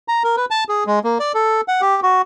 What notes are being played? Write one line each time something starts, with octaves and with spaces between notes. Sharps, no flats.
A#5
A#4
B4
A5
G#4
G#3
A#3
D5
A4
F#5
G4
F#4